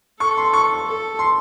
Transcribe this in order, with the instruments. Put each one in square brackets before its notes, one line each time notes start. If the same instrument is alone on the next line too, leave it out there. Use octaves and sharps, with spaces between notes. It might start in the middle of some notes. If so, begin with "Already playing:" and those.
[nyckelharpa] A4 [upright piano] C#6
[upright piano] C6
C#6
[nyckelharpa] A4
[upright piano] C6